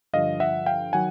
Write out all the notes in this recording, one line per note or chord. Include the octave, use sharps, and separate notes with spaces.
G2 D3 F3 D#5 F5
E5 F#5
F5 G5
D#3 F#3 F#5 G#5